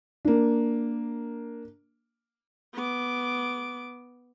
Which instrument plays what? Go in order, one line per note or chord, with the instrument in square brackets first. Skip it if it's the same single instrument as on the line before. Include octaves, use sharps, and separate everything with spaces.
[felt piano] A#3 D4
[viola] B3 D6